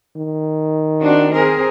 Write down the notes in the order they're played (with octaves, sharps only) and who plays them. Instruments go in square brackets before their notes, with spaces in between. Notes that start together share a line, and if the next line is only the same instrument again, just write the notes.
[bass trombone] D#3
[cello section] C4 D4 F#4
C4 G#4 A#4